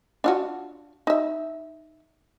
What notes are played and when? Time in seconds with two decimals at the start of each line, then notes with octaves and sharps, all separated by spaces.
0.24 D4 F4 F#4
1.07 D#4 E5